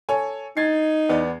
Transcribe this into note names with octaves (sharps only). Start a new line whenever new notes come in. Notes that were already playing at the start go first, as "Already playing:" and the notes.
A4 C#5 G#5
D#4 G#6 A6 C7
E2 B3 D5